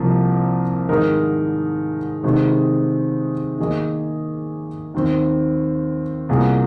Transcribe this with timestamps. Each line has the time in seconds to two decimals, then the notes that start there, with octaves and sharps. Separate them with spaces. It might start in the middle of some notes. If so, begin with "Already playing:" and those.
Already playing: C2 C3 F3 A#3
0.89 G#2 D#3 G#3 D#4 A#4
2.24 C3 D#3 G#3 C4 D#4
3.58 D#3 A#3 G#4 D#5
4.94 D#2 D#3 C4
6.29 C2 A#2 A#3 G#4